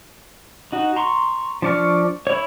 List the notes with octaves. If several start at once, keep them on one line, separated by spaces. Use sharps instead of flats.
D#4 F#4
A#5 C6 C#6
F3 D4 D5 C#6 F6
E4 C#5